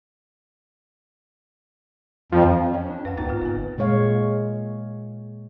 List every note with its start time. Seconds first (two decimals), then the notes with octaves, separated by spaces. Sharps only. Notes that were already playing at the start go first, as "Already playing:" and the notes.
2.32 F2 F3
2.74 C#4
2.90 D4
3.05 F#2 B4 F5 F#5
3.17 G#1 D2 B2 D#4 G5 A#5 A6
3.29 G#2 F4 F6
3.42 G1 B4 G#5
3.78 A#2 G#3 C#5 F5